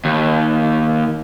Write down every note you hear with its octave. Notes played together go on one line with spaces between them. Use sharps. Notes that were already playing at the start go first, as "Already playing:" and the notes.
D#2